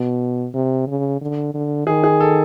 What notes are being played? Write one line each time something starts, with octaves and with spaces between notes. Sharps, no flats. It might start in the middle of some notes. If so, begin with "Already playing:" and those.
Already playing: B2
C3
C#3
D3
D3
D#3 G#4
G#4
A4